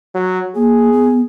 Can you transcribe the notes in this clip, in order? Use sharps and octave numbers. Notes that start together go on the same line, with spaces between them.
F#3
A#3 G#4
B3